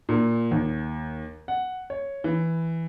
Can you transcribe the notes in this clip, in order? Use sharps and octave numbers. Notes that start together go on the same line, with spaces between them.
A#2
D#2
F#5
C#5
E3